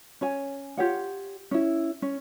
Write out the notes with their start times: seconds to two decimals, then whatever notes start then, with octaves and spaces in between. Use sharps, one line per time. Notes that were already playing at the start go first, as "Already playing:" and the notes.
0.21 C#4 C#5 G#5
0.77 F4 G4 C#5 F#5
1.51 C#4 E4
2.02 C#4